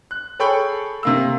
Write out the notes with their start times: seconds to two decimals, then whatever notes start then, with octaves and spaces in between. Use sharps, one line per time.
0.11 F#6
0.39 G#4 A4 C#5 G5 B5 C#6
1.03 C3 A#3 E6